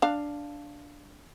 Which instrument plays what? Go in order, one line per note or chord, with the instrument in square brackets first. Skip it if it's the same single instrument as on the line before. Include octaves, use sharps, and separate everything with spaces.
[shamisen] D4 F5